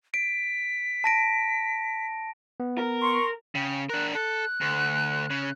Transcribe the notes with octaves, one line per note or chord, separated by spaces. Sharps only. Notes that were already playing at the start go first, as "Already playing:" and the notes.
B6 D7
A5 A#6 D7
B3
A#4
C6 C#6
C#3 G5
D4 A#4 F#6
A4 F#6
D2
C#3